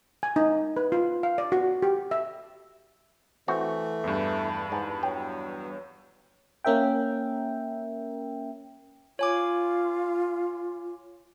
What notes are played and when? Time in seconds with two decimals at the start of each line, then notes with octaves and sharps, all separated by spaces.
0.23 G#5
0.36 D#4
0.77 B4
0.92 F4
1.23 F5
1.38 D5
1.52 F#4
1.82 G4
2.11 E5
3.48 E3 A3 C4 F#4
4.04 E2 G2 A5 B5
4.72 G#2
5.03 F#3 G5
6.64 A#3 C#4 A#4 E5 G5
9.19 F4 C#5 G#5 D6